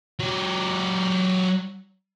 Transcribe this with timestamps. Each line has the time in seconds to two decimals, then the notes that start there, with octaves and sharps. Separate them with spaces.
0.20 F#3 G4